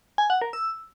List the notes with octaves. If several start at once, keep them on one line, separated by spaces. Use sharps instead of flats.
G#5
F#5
A#4
E6